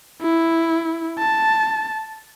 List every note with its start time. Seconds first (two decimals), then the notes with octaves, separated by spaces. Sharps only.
0.22 E4
1.19 A5